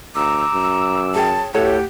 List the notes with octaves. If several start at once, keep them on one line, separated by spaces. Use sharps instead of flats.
D2 A#5 D6 E6
F#2
G#4 C#5 G5 A5
D2 A2 G4 A4 C#5 F#5